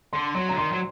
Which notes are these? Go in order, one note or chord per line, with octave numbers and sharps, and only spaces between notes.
D3 C6
F#3 C6
D3 A#5
D#3 C6
F#3